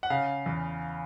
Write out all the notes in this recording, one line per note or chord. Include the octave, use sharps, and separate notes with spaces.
F#5
C#3 F5
E2